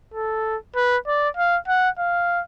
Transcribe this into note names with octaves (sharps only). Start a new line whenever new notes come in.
A4
B4
D5
F5
F#5
F5